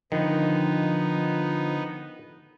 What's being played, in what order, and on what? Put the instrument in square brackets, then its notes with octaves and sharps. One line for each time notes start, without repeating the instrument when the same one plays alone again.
[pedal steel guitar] D3 [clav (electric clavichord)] D#3 [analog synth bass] F3 [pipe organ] B3 D#4